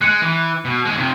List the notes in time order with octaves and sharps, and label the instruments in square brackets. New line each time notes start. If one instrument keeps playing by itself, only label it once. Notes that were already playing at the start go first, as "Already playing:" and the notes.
[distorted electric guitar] G#3 [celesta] F#6 C#7
[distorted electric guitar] E3
B2
D#2 G#3
C3 F3